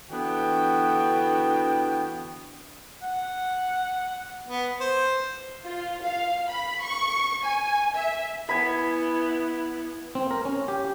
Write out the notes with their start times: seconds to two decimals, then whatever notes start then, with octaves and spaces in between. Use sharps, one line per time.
0.11 D3 E3 B3 D4 F#4 G5
3.03 F#5
4.48 B3
4.80 C5
5.63 F4
6.03 F5
6.49 B5
6.82 C#6
7.43 G#5
7.94 E5
8.49 B3 E4 G#5 B5
10.15 C4
10.31 A#4
10.45 C#4
10.68 G4